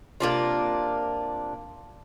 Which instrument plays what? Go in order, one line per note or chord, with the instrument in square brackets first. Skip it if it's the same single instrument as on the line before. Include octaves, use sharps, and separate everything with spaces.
[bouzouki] C3 A#3 D4 F4